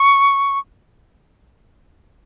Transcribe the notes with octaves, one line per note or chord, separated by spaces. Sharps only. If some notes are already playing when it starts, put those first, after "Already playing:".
Already playing: C#6